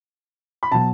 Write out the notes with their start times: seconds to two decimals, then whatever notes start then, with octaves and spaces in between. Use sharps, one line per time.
0.63 B5
0.72 B2 F#3 A5